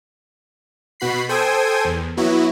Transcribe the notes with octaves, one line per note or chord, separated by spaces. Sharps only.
B2 F#4 B5 C7
A4 C5 G5 G#5 D#6 G#6
E2
F#3 B3 E4 F#4